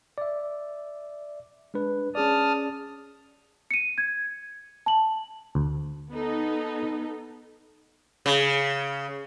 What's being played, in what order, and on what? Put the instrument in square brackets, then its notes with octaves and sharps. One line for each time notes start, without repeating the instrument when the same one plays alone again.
[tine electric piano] D5 E5
G#3 D4 B4
[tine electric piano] C#4 G#4 D5 [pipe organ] A5 D#6 F6
[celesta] C#7 D#7
G#6
A5 F#7
[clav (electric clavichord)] D2
[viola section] B3 D#4 A4
[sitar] C#3